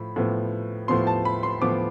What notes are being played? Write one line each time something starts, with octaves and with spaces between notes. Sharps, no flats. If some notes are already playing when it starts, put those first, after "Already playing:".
Already playing: A2 F3 B5
A2 F3 B3
A2 F3 B3 C6
A5
B5
C6
A2 F3 B3 D6